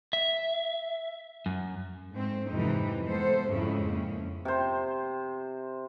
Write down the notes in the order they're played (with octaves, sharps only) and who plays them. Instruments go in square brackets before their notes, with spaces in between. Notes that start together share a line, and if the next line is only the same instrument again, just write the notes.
[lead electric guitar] E5
F#2
[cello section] G#2 A3 C4
F2 G#2 C3 E3 D#4
G#3 A3 B3 A4 C5
F2 G#2 C#3 G#3 C#4 E4
F2 A#3 C#4
[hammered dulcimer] C3 C5